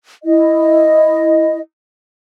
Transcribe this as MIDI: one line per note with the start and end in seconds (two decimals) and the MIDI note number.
0.24 1.57 64
0.24 1.57 75